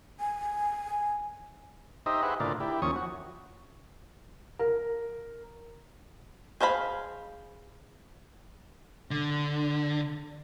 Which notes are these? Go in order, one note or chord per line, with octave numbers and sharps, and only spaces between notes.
G#5
D#4 G4 C5 D#5 E5
G4 G#4 B4 C5 E5 F#5
A2 D3 F4 A#4 D5
E4 G4
D#2 F3 C#4 C#6 D#6
F#4
A#4
G#4 C5 F5 A#5 B5
D3